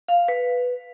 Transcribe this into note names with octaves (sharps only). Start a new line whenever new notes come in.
F5
B4